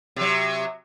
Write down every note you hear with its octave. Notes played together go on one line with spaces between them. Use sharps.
C3 F#3